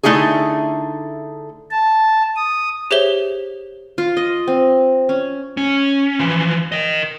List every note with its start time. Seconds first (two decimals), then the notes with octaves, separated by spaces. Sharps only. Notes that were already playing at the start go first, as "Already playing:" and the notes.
0.03 D3 A3 D#4 E4 F#4 G#4
1.71 A5
2.36 D#6
2.91 G4 G#4 C5 C#5 E5 G7
3.98 F4
4.17 D#5
4.48 C4
5.09 C#4
5.57 C#4
6.19 E3 F3
6.72 A#4 D#5